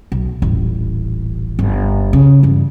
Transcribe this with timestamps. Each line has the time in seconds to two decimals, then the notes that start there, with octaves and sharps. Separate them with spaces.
0.12 B1
0.42 D#1 A1
1.59 G1
2.13 C#3
2.43 G2 E3